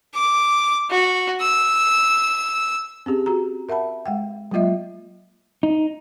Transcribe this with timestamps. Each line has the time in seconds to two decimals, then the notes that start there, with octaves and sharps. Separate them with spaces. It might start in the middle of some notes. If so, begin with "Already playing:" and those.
0.14 D6
0.90 F#4
1.41 E6
3.06 C4 C#4 G4 G#4
3.26 F#4 G#4 A#5
3.69 A#4 E5 F#5 A5 B5
4.06 G#3 F#5 G5
4.51 F#3 G#3 A#3 F4 D#5 E5
5.63 D#4